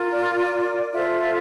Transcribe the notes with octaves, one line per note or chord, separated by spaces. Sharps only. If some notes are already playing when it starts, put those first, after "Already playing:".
Already playing: F4 A#4
D5
F4 A4 C5 E5